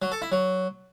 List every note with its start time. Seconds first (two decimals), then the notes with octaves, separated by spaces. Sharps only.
0.02 F#3
0.12 A4
0.22 E4
0.32 F#3